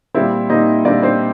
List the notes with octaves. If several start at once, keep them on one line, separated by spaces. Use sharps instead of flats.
A#2 G3 C4 E4 E5
A#2 G3 C4 D#4 D#5
A#2 G3 C4 D4 D5
C4 C5